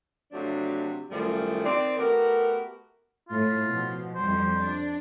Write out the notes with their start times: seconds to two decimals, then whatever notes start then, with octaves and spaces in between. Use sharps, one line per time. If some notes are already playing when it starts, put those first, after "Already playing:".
0.32 C3 F3 F#3 A3 D4
1.10 F#2 A2 D#3 F3 G3 A3
1.64 D#3 C4 D5
1.97 A3 B3 F#4 G4 A#4
3.29 A2 A3 F4
3.68 B2 F3
4.15 F2 G3 C5
4.56 D4